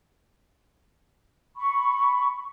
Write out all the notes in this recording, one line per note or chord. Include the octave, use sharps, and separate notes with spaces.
B5 C#6